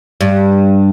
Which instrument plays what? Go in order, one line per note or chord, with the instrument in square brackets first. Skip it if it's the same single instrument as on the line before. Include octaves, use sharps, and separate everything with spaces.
[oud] G2